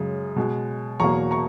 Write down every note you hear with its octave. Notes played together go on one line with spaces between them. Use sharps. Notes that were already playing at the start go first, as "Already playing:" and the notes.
Already playing: F#2 C#3 G#3
B2 G#3
E2 B2 F#3 A#3 A#5 C#6
A#5 C#6